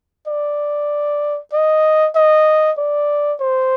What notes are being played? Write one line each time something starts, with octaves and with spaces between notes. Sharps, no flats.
D5
D#5
D#5
D5
C5